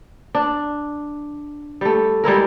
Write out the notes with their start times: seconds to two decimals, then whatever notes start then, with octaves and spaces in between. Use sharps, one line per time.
0.35 D4
1.81 G3 A3
2.24 G3 G#3 E4 A#4